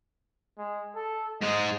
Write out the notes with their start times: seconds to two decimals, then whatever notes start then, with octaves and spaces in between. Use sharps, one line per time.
0.58 G#3
0.95 A4
1.41 G#2 G#3 D#5